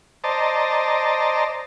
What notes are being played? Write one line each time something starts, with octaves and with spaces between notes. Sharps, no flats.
C5 D5 D#5 A5 A#5